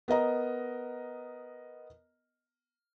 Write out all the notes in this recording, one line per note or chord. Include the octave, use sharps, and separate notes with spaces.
B3 A#4 D#5 A#5